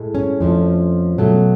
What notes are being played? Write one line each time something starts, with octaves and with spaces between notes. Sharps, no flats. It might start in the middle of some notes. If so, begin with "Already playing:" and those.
Already playing: A2 G#3
C#4
F2 F3 A3
B2 F#3 A3